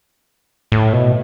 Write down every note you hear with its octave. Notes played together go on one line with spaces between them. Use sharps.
A2
B2